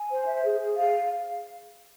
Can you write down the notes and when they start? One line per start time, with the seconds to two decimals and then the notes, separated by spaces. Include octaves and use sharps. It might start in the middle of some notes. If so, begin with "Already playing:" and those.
Already playing: G#5
0.10 C5
0.26 E5
0.42 G#4
0.59 G#4
0.76 F5